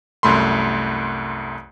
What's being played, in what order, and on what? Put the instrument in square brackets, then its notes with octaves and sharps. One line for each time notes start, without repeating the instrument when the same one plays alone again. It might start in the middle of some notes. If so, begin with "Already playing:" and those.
[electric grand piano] C2 F#2 A3 B5 C6